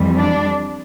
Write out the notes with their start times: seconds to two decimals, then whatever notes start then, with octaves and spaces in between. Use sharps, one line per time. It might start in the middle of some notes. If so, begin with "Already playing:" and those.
Already playing: F2 E3 G3
0.16 D4 D5